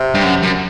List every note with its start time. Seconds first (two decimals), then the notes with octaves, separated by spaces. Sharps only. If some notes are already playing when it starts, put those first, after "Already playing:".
Already playing: C3
0.15 G2
0.24 F#2
0.43 F#2